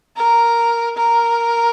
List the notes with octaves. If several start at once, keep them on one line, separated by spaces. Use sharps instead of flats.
A#4
A#4